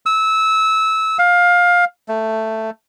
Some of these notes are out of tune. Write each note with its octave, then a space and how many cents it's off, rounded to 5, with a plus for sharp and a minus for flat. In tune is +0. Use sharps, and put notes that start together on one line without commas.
E6 -20
F5 +20
A3 +5